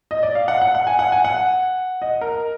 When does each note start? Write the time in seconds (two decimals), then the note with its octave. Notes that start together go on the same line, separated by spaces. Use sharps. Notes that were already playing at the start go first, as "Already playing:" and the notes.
0.11 D#5
0.23 D5
0.35 F5
0.48 F#5
0.62 F#5
0.75 F#5
0.87 G#5
0.99 F#5
1.12 G#5
1.25 F#5
2.02 D#5
2.21 A#4